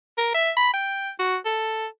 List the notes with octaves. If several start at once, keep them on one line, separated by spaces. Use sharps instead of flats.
A#4
E5
B5
G5
F#4
A4